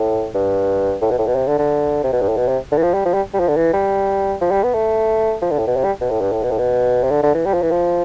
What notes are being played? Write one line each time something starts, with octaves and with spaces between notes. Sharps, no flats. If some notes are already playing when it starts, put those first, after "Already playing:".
Already playing: A2
G2
A2
B2
A2
B2
C3
D3
D3
C3
B2
G2
A2
B2
C3
D3
E3
F3
G3
F3
G3
G3
F3
D3
E3
G3
F3
G3
B3
A3
F3
D3
A2
B2
C3
G3
B2
A2
G2
A2
B2
A2
B2
C3
D3
D3
E3
G3
F3
E3
F3